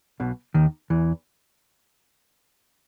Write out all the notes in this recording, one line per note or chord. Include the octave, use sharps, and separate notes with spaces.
B1 B2
D#2 D#3
E2 E3